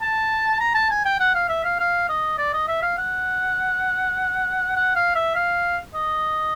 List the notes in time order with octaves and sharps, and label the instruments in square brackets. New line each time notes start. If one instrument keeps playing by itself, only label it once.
[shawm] A5
A#5
A5
G#5
G5
F#5
F5
E5
F5
F5
D#5
D5
D#5
E5
F5
F#5
F#5
F5
E5
F5
D#5